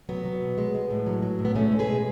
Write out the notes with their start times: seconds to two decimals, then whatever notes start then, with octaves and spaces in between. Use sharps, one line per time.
0.09 F#3 B3
0.25 F#3
0.42 B2
0.58 G#3
0.75 G#3
0.90 A2
1.06 F#3
1.22 F#3
1.39 A2
1.45 B3
1.55 G#3 A3 C#4
1.72 G#3
1.79 G#4 B4
1.87 B2